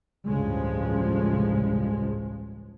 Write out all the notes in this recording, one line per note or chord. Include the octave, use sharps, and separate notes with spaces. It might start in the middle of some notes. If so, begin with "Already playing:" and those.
A1 D2 G2 C#3 F3 G#3